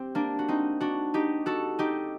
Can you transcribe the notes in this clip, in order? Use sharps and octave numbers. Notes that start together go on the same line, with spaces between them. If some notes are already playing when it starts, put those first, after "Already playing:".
Already playing: C4 G4
A#3 D4
F#4
C4 D#4
D4 F#4
D#4 G4
F#4 A4
D#4 G4